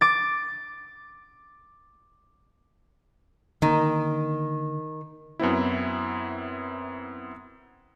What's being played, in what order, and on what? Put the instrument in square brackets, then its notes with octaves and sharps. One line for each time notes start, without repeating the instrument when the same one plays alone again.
[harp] D6 A6
[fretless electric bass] D3 A#3 [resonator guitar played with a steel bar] D#3
[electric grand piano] F#2 B3 C4 E4